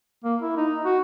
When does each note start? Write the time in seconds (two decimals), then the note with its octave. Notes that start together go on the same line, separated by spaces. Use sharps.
0.24 A#3
0.42 E4
0.57 D#4
0.85 F#4